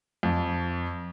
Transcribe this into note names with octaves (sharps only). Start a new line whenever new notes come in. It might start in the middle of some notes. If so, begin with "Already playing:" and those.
F2